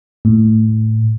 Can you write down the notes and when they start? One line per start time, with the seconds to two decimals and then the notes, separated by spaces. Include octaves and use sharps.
0.25 A2